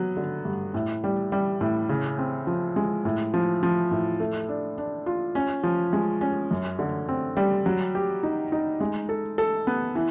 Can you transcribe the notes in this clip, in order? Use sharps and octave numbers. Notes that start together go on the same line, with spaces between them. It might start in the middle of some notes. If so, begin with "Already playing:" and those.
Already playing: F#3 B3
D3
G2
A2
G3
G3
A2
C#3
C4
F3
G#3
A2
F3
F3
A2
A3
D4
D4
F4
C#4
F3
G#3
C#4
F#2
D3
C4
G3
F#3
G4
D#4
D#4
G#3
A4
A4
B3
E3